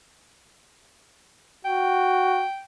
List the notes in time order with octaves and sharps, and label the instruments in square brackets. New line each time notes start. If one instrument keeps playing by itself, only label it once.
[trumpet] F#4 [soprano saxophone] G5